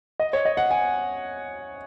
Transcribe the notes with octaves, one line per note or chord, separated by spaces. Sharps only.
D#5
C#5
D#5
F#5
G#5